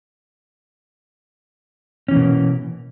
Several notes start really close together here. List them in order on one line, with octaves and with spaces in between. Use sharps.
C#4 E3 A#3 B2